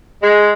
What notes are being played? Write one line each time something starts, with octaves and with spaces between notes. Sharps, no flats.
G#3